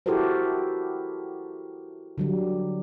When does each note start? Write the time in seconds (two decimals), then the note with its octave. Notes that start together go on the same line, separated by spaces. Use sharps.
0.06 E4 F#4 G4 A4 A#4 C5
2.18 D3 F#3 G3